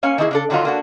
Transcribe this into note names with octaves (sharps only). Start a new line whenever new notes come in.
A#3 C#4 C#5 F5 G#5
D#3 E3 A#3 E4 G#4
C#3 D4 A4
D3 D#3 F#3 D#4 F4
A#3 D4 F#4